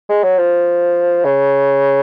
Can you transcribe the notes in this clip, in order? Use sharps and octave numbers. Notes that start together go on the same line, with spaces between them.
G#3
F#3
F3
C#3